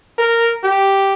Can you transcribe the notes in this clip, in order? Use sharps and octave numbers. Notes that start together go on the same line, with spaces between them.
A#4
G4